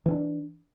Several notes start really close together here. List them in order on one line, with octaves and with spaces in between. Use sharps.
E3 C4 D4